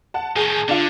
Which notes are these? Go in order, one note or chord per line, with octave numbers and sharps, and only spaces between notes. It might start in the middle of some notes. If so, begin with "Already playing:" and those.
F#5 A5
A2 D#3 G#4 A5
D3 D4 F4